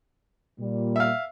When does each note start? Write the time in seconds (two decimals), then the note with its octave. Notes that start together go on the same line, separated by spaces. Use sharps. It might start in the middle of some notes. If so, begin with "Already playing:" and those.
0.59 A#2 G3
0.96 E5 F5